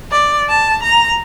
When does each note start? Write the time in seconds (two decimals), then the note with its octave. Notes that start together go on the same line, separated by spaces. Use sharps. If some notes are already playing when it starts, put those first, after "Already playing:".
0.12 D5
0.49 A5
0.83 A#5